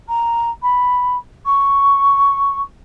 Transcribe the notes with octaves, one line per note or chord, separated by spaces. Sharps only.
A#5
B5
C#6